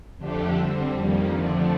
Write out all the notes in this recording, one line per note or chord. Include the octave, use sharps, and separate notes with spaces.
F2 D3 A3 D4 G4
D3 G3 C4
F2 D#3 G3 A#3
F2 D3 F3 A3 D4